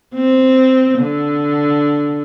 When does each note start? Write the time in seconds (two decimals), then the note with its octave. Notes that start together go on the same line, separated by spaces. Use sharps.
0.15 C4
0.98 D3